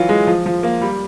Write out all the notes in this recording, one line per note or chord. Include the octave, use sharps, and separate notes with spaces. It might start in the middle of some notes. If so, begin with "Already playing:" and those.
Already playing: E3 F#3 F4
G#3
F3
F3
A#3
G3